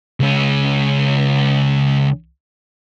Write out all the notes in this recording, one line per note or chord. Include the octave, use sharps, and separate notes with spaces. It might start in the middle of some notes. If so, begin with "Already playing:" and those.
C#2 C#4